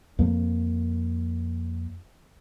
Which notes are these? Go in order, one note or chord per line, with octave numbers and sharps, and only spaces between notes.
F2 A#3